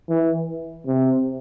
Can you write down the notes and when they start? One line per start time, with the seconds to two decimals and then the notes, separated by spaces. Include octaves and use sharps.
0.09 E3
0.87 C3